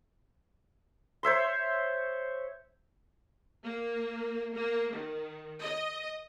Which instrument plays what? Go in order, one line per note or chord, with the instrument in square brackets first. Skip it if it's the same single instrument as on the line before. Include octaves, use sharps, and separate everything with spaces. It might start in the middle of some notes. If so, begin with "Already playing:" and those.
[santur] C5 C#5 E5 C6
[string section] A#3
A#3
D#3
D#5